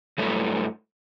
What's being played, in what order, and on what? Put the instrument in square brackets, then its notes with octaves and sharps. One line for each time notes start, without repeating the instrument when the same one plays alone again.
[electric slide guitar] G2 F#3 A3 E4